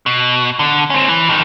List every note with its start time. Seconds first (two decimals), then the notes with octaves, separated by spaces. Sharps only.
0.06 B2
0.59 D3
0.90 C4 C#4
1.09 E3
1.29 F2 D#3